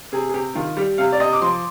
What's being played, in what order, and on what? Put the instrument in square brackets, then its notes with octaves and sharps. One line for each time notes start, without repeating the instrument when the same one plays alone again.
[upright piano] C3 G#4
G#4
C3 G4
D#3 F4
G3 G4
C3 F5
D5
C3 D#5
D6
F3 C6